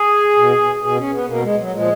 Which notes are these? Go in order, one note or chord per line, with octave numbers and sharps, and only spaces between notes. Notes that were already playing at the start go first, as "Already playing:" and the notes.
Already playing: G#4
B2
B2 G#4
C#4
B3
B2 A#3
G#3
F#3
A#2 F3 G#3